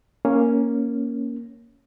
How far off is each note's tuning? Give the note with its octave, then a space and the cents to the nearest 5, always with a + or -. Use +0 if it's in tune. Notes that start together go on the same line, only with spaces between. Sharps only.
A#3 +5 C#4 +0